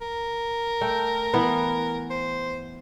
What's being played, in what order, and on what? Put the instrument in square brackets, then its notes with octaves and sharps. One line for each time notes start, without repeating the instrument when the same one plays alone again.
[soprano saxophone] A#4
[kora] A3 G5
E3 B3 B4
[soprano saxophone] C5